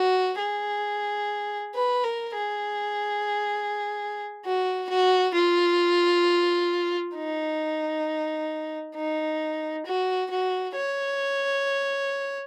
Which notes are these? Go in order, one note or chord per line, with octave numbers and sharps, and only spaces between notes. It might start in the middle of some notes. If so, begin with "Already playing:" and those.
Already playing: F#4
G#4
B4
A#4
G#4
F#4
F#4
F4
D#4
D#4
F#4
F#4
C#5